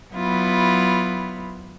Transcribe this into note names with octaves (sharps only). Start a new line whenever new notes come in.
F#3 B3 E4 F4